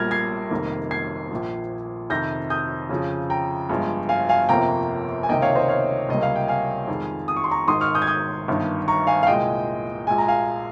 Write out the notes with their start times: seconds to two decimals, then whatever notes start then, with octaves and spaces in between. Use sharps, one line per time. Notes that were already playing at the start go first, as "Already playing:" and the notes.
Already playing: A#1 A#2 G3 A#3 F6 G#6 A#6
0.11 G#6 C7
0.50 F1 F2 D#3 G3 A#3
0.91 G#6 C7
1.31 A#1 A#2 F3
2.10 F2 C3 D#3 G6 A#6
2.50 D#6 G6
2.89 F2 C#3 F3
3.30 G5 A#5
3.69 G1 G2 F3 G#3
4.09 F5 G#5
4.29 F5 G#5
4.49 G1 F2 C3 F3 A#3 G5 A#5
5.23 G#5
5.29 C#2 C3 D#3 A#3 D#5 G5
5.42 C#5 F5
5.55 C5 D#5
5.68 C#5 F5
6.09 C#2 C3 G3 A#3 D#5
6.23 F5
6.36 G5
6.48 F5 G#5
6.88 F2 D#3 G#3
7.28 D#6
7.36 C#6
7.44 C6
7.51 A#5 C#6
7.68 G#1 G#2 D#3 C6 D#6
7.81 C#6 F6
7.95 D#6 G6
8.02 G#6
8.07 D#6 G6
8.48 G1 G2 D#3
8.88 A#5 C#6
9.07 F5 G#5
9.23 F5
9.27 C2 A#2 G#3 D#5 G5
10.07 A#1 A#2 G#3 G#5
10.18 A#5
10.28 F5 G#5